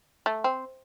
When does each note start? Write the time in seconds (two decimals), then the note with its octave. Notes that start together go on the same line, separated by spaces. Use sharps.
0.26 A3
0.44 C4